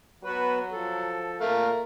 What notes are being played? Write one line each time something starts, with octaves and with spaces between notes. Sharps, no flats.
F#3 B3 F#4 B4
F3 A4
A#2 A3 A#4 F5